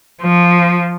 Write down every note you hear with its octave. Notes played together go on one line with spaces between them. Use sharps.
F3